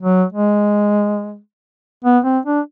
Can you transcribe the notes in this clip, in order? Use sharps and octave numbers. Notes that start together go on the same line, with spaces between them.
F#3
G#3
B3
C4
D4